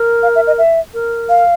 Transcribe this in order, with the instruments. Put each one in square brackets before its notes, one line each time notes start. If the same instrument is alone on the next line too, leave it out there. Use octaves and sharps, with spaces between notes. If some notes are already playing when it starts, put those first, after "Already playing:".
Already playing: [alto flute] A#4
[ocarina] F5
E5
D#5
E5
[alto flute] A#4
[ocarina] F5